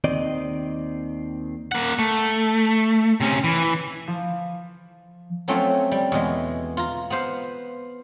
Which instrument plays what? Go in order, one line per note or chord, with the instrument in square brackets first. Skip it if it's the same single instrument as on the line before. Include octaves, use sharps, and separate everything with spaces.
[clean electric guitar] D#2 D#3 C4 D5 D#5
[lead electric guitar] A#3 F#5
A3
C3 C#4
E3
[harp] F3
[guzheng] F3 F#3 A3 C4 C#4 F4
G3
E2 B2 G#3
F4 A#5
B3 B4 C5 F5